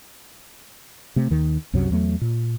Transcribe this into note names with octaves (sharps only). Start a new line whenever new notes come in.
C3 A3
D#2 D#3
C2 F#2 C3 F#3
E2 F#3 A3
A#2